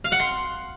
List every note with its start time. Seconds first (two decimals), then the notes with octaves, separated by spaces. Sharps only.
0.04 F5
0.12 F#5
0.20 C6